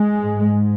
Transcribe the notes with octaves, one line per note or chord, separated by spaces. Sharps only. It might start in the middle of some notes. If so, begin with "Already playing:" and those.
Already playing: G#3
G#2